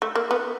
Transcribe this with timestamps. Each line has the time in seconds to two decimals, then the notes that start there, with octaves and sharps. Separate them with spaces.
0.02 A3
0.15 A#3
0.31 B3